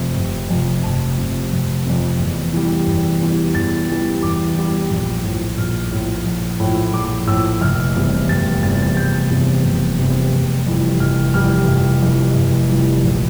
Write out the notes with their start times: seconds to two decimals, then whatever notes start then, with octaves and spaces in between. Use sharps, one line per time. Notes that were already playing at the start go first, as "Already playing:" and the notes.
Already playing: F1 F2 C3
0.16 F1
0.50 F2 C3
0.83 F1 A5
1.18 F2 C3
1.52 F1
1.86 F2 C3
2.19 E2
2.53 E3 G3
2.87 E2
3.21 E3 G3
3.55 E2 A6
3.89 E3 G3
4.23 E2 D6
4.56 E3 G3
4.90 A#1
5.24 A2 F3
5.58 A#1 F6
5.92 A2 F3
6.26 A#1
6.60 A2 F3
6.94 A#1 D6
7.27 A2 F3 E6
7.61 F1 F6
7.95 E2 C3 G3
8.29 F1 A6
8.63 E2 C3 G3 A6
8.82 A6
8.97 F1 G6
9.30 E2 C3 G3
9.64 F1
9.99 E2 C3 G3
10.32 F1
10.67 F2 E3 G3
11.00 F1 F6
11.34 F2 E3 G3 F6
11.68 F1
12.02 F2 E3 G3
12.35 F1
12.69 F2 E3 G3
13.04 A#1